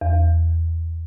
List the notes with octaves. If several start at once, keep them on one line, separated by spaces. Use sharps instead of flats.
E2